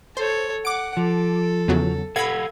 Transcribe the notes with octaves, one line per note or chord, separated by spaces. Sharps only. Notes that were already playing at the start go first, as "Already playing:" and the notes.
A4 C5 C#5
F#5 D6 D7
F3 A4
E2 C#3 F#3
A4 F5 F#5 B5 G#6